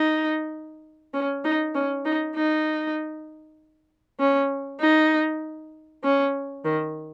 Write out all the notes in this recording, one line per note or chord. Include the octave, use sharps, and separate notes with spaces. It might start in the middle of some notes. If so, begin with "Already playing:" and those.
Already playing: D#4
C#4
D#4
C#4
D#4
D#4
C#4
D#4
C#4
D#3